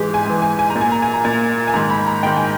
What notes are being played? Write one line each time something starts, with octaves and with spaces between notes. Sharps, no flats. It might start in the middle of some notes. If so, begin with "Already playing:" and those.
Already playing: G#2 E3 G4 G#4
G#5
G#2 E3
G#5
G#5
A#5
A#2
G#5
A#5
G#5
A#5
A#2 G#5
G#5
G#2 D#3 A#5
B5
A#5
G#2 D#3 G5
G#5